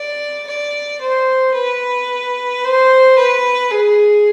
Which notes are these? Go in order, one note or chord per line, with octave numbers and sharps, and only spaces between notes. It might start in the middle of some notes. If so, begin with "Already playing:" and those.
Already playing: D5
D5
C5
B4
C5
B4
G#4